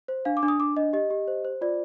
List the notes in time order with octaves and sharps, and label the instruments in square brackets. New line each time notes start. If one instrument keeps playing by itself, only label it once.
[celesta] C5
D4 F5
D6
D4
D#6
D4 D6
D4 D#5
G4 D#5
G4
C5
C5
F4 D5